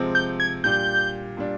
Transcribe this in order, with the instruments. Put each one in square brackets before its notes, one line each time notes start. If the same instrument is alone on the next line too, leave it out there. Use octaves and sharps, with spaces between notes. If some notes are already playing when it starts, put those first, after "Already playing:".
Already playing: [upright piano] C3 F3 G#3 C4
[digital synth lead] G6
G#6
[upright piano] A#2 G3 D4 G4 [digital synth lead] G6
[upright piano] A#2 G3 D4